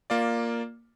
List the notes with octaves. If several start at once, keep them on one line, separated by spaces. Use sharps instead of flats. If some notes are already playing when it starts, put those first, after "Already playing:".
A#3 F4 D5